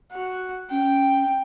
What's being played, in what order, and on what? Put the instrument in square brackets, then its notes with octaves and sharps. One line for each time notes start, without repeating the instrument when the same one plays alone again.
[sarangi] F#4
[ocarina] C#4 [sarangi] G5